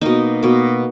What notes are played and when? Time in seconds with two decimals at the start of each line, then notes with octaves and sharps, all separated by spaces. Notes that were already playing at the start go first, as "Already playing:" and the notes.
0.01 B2 A#3 D#4
0.43 B2 A#3